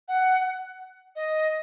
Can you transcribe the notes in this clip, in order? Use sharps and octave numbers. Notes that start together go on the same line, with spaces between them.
F#5
D#5